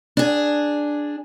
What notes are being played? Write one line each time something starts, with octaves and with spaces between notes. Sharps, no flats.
D4 G#4